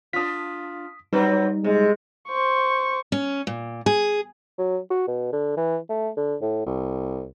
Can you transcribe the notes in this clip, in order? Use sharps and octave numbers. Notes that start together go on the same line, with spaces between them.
D4 F4 D#6 B6
F#3 G3 C4 D#4 B4
C3 G#3
C5 C#6
C#4
A#2
G#4
F#3
F#4
B2
D3
E3
A3
D3
A2
C2